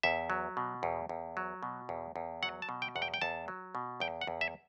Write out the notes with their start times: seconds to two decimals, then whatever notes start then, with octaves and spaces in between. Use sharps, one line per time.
0.03 E2 E5
0.30 F#3
0.57 B2
0.83 E2
1.09 E2
1.37 F#3
1.63 B2
1.89 E2
2.16 E2
2.43 F#3 F#5
2.62 A5
2.69 B2
2.82 G5
2.96 E2 F#5
3.02 G5
3.14 G5
3.21 E2 A5
3.48 F#3
3.75 B2
4.00 E2 G5
4.21 F#5
4.27 E2
4.41 E5